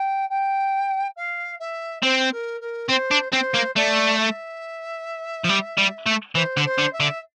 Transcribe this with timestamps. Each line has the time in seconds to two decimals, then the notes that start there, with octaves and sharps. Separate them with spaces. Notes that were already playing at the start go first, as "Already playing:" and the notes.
Already playing: G5
0.29 G5
1.16 F5
1.60 E5
2.03 C4 C5
2.32 A#4
2.61 A#4
2.89 C4 C5
3.11 D4
3.32 C4 C5
3.54 A#3
3.76 A3 D5
4.19 E5
5.44 F3
5.49 G3
5.78 G3
6.06 A3
6.35 E3 C5
6.57 D3
6.65 C5
6.78 D3
6.93 E5
7.00 D3